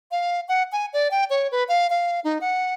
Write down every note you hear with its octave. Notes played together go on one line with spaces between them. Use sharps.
F5
F#5
G#5
D5
G5
C#5
B4
F5
F5
D#4
F#5